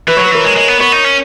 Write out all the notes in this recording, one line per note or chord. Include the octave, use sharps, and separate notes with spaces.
E3 B4
F#3 C#5
B4
E3 A#4
G#3
G#3
B3
B3 C#5
D#4
C#4